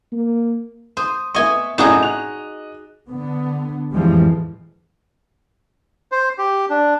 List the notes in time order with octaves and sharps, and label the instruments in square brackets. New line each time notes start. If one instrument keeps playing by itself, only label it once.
[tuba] A#3
[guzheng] C5 [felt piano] D#6
[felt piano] B3 E5 C#6 [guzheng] D#5 G#5
[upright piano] G#1 F#2 A2 [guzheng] D#4 F#4 G#4 [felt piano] D#5 E7
[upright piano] F#6 F7
[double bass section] D3 B3
A1 F2 E3 F3 G3 G#3
[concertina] C5
G4
D4